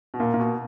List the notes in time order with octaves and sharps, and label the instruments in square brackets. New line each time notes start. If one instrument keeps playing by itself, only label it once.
[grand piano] B2
[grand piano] A#2 [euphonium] A#3
[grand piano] A#2
B2